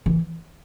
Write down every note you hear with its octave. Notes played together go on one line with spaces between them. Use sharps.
E3